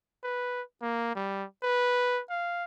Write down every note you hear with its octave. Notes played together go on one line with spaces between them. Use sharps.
B4
A#3
G3
B4
F5